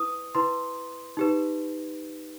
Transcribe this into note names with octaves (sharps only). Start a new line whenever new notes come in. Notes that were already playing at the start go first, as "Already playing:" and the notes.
Already playing: E4 B4 D#6
E4 B4 C6
D#4 G4 B4